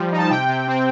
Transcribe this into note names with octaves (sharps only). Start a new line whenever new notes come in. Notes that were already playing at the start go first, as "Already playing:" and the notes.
Already playing: F3 G3
D#4
A5
C3 G5
C3
C4